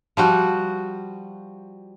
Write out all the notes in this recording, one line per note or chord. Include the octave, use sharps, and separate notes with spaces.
F3 G3 F#4